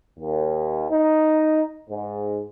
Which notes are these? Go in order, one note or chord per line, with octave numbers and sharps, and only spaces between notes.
D#2
D#4
G#2